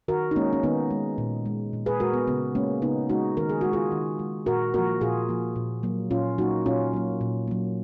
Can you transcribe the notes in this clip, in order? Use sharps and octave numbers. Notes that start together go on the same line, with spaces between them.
D#3 F#4 A#4
D#4
G#3 A#3 C#4
C#4
D#3 B3 D#4
G#3
A#2
G#3
A#2
G#4 B4
G#3 F#4 A#4
B3
C#3 B3
G#3 A#3 C#4
C#3 B3 D#4
G#3 D#4 F#4
D#3 A#4
G#4
G#3 F#4
F4 G#4
D#3
G#3
A#2 F#4 A#4
F3 A#3 F#4 A#4
A#2 F4 G#4
F3 A#3
A#2
F#3 A#3
A#2 C#4 F4
F#3 A#3 D#4 F#4
A#2 C#4 F4
F#3 A#3
A#2
F#3 A#3